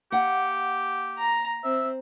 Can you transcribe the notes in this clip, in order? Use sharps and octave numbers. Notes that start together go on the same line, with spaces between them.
A#3 G4 F#5
A#5
C4 E5